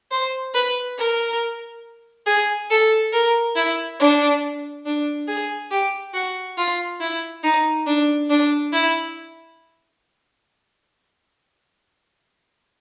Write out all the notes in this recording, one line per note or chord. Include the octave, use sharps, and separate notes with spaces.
C5
B4
A#4
G#4
A4
A#4
E4
D4
D4
G#4
G4
F#4
F4
E4
D#4
D4
D4
E4